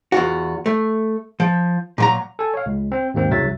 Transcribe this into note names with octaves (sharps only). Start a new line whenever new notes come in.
E2 F4 F#4
A3
F3
A#2 F#3 A#5
A4 G#5
C#5 F5
C#2
C4
D#2 G#2 A#3 C4
C2 F#2 C#3 F#3 E5 A6